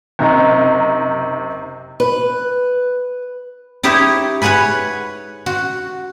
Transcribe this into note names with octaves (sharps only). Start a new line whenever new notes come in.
F#1 C3 D#4 A#5
B4
D#4 E4 G4 C#5 D#5
B4 C#5 F#5 G#5 B5
F#4